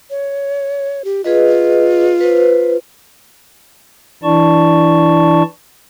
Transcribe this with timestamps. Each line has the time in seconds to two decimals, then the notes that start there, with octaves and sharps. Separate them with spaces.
0.10 C#5
1.04 G4
1.24 F4 G#4 B4 D#5
2.21 B4 C5
4.23 E3 D4 E4 D5 A5 C#6